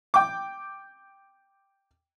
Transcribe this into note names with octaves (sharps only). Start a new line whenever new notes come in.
G5 D6